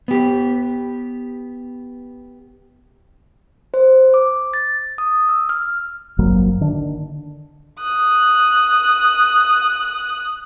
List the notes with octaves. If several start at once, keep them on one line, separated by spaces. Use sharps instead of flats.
B3 G4
C5
D6
A6
D#6
E6
F6
G#1 G2 F#3 A#3
D3 D#3 D4
D#6 F#6